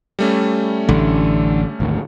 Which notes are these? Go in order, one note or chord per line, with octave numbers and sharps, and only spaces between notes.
G3 A3 C#4
A1 D3
G#1 D2